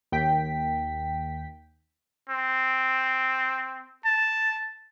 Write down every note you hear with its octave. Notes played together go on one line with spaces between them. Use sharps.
D#2 G5 B6
C4
A5